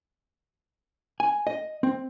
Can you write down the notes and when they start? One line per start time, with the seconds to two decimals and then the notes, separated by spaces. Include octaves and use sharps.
1.20 G#5
1.47 D#5
1.83 C4